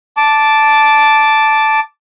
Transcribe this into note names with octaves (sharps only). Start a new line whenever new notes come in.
A5 D6